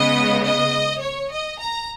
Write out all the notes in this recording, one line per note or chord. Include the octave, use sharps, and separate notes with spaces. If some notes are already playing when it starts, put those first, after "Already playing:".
Already playing: C#3 G#3 B3 D#5
D#5
C#5
D#5
A#5